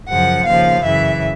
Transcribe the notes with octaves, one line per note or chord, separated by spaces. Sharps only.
F#2 C#3 F3 F#5
D#2 C#3 F3 F5
F#2 C#3 E3 E5